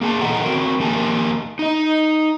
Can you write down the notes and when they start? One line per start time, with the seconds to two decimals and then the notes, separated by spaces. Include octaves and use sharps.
0.01 A#3 G#4 G5 A5
0.21 A#2 E3 A4 D#5 F#5 A#5
0.44 C4 F#4 A#4
0.80 F3 A#3 G4 A#4 G#5 A5
1.59 D#4 D#5